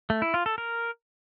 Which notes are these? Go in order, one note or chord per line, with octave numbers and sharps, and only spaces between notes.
A3
E4
F4
A4
A#4